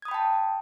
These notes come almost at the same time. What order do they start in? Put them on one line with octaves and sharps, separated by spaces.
G#6 D#6 B5 G5 A5